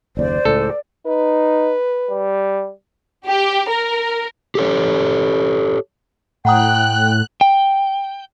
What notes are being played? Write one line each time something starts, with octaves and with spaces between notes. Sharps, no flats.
F#1 D#2 C#3 C5 D5
C#2 A2 C#3 A4
D#4 B4
G3
G4
A#4
G4 A4 C#5
A2 F#5 G5 A#5 D#6 F#6
G5